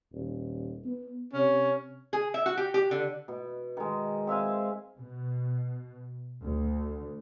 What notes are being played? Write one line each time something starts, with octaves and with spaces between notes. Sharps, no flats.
D#1
B3
C3 C#4
G#4
E5
F#4
G4
G4
D3
B2
D#3 G#3
C4 E5 F5 G#5
B2
D2